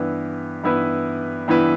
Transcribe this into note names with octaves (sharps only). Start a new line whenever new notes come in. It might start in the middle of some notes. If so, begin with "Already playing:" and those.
Already playing: G2 E3 B3 E4 B4
G2 E3 B3 E4 B4
G2 E3 B3 E4 B4